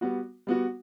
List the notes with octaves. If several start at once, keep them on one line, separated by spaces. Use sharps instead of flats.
G3 B3 F#4
G3 B3 F#4